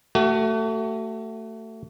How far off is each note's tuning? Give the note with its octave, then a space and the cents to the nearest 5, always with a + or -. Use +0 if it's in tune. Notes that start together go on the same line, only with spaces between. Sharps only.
A3 +20 F#4 +40